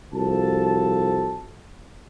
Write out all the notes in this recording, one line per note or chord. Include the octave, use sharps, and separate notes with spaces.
C2 F3 F#4 A4 A5